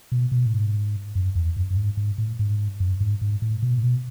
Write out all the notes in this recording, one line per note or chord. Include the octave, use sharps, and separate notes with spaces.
B2
B2
A2
G#2
F#2
E2
F#2
F#2
G#2
G#2
A2
G#2
F#2
G#2
G#2
A2
B2
A2
B2